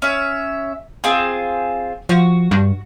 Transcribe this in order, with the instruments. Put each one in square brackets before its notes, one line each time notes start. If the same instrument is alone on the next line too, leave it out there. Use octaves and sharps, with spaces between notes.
[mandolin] C#4 E5
C4 F4 G#4
[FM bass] F3 [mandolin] F#4
[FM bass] G2